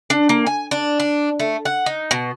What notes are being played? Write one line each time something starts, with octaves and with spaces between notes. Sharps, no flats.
D4
A#3
G#5
D4
D4
A3
F#5
D#4
B2